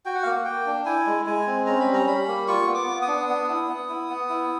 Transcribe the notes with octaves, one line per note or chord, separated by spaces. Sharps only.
F#4 G5
F#5
A#3 F5
F#5
A#3 G5
D4
E4 G#5
G#3
G#3 G#5
C4
C#4 A#5
B5
G3
A#5
G3 B5
A#3
F4 C#6
B3
D6
B3
D#6
D4
B3
E4
B3
E4
B3
E4